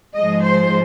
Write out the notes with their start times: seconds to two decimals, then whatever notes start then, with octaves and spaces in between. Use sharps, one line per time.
0.15 G#2 F3 G#3 D#5
0.45 C5